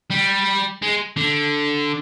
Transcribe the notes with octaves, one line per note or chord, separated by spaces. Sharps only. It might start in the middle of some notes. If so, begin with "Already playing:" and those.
G3
G#3
D3